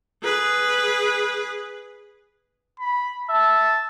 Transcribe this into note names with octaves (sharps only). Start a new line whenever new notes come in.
G#4 B4
B5
E5 A5